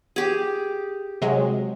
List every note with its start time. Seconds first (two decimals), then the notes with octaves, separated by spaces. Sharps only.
0.16 G4 G#4
1.22 C3 F#3 G#3